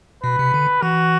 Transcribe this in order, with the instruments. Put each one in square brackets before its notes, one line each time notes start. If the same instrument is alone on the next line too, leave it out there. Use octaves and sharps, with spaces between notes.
[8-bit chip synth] B2 [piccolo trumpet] B4
[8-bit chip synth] C3
D3
[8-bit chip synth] E3 [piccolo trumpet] F#4